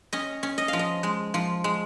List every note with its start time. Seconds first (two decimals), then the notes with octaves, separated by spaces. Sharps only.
0.13 C#4 D#5
0.43 C#4
0.58 D#5
0.68 F3 F5
0.79 D#5
1.03 G#3
1.34 F3
1.64 G#3